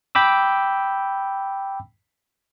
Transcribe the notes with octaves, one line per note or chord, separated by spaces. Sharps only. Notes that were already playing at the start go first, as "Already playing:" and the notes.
G5 B5 D6 E6